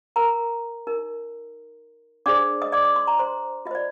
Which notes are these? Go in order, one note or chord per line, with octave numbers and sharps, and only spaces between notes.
A#4 A#5
D#4 A#4
D4 G#4 C5 D5 D6
D#5 D#6
D5 D6
D5 D6
C6
A#5
C5 C6
F4 D#5
C5 D5